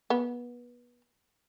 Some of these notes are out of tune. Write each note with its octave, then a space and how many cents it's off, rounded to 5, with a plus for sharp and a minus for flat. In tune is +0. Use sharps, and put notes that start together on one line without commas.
B3 -25